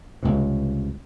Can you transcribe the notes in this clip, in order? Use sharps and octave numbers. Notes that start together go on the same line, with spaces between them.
C#2 G2 C3